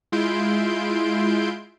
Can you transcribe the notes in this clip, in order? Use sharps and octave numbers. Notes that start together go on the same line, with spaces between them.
G#3 E4 F4 C6 G6 D7